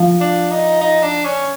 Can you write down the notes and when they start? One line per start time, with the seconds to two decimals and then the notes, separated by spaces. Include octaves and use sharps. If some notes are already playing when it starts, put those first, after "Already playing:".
Already playing: F3
0.21 D4
0.51 D#4
0.81 D#4
1.02 D4
1.25 C#4